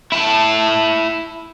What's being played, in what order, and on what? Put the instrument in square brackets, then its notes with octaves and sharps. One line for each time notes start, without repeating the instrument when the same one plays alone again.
[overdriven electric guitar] E4 A5